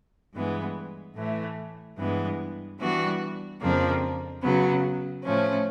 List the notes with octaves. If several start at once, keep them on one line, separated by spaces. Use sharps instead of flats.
G2 E3 G#3 B3
A2 E3 A3
G2 E3 G#3 B3
E3 G3 B3 D4 F#4
F2 C#3 F3 A#3 D4
C#3 F#3 B3
A2 F3 A3 C#4